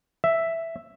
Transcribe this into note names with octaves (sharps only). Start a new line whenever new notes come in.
E5